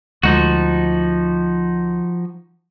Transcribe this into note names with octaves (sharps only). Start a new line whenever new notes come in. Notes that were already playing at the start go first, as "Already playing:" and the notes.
D2 F3 G#3 D#4 F#4